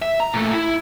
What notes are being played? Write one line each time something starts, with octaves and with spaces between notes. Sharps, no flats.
E5
A#5
A#2 A3
E4